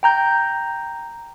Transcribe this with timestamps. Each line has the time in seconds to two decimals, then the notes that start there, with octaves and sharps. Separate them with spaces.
0.03 G5 A#5 G6